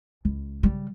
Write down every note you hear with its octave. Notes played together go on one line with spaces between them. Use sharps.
C#2
C#3 G3